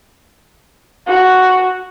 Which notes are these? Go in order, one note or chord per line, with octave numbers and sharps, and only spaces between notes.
F#4